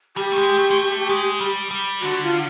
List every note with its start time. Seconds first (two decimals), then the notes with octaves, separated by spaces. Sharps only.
0.17 G3 G4
0.33 A3
0.38 G#3
0.58 A3
0.71 G#3
0.79 A3
1.09 G#3
1.41 G3
1.71 G3
2.01 D3 F#4
2.23 F4